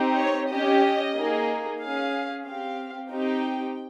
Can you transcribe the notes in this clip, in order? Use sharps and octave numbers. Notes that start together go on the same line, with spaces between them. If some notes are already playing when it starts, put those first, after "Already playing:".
Already playing: C4 D#4 G4
C#5
C#4 G4 D#5
A#3 D#4 G#4
C#4 G#4 F5
C4 G4 F5
C4 D#4 G4 G5